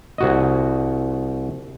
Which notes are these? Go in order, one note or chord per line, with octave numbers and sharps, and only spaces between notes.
C2 F#4 D#5